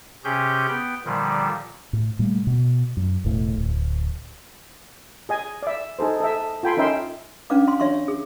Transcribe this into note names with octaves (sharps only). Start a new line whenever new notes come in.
C3 C#4 G4 G#4 G6
B3 G5
A#2 D3 D#3 F3 G3
A2
A#2 G3 A3
B2
F#2
E1 A2
D1
G#4 D#5 G#5
D5 E5
D#4 G#4 A4 C5
A4 D#5 E5
F4 A4 G5 G#5 B5 C6
C#4 D#4 A#4 E5 G5 C6
C#4 D4 B4 F5 D6
F5 C6
D4 C#5 E5 C6 C#6
E5
G#4